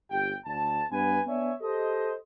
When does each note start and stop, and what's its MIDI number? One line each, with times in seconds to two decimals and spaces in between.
0.11 0.33 31
0.11 0.33 67
0.11 0.33 79
0.46 0.83 38
0.46 0.83 81
0.91 1.20 43
0.91 1.20 59
0.91 1.20 71
0.91 1.20 80
1.26 1.52 59
1.26 1.52 62
1.26 1.52 73
1.26 1.52 76
1.26 1.52 80
1.61 2.14 67
1.61 2.14 69
1.61 2.14 72
1.61 2.14 75